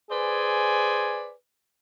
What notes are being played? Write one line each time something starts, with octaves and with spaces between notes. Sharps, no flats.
G#4 B4 C5 D5 G#5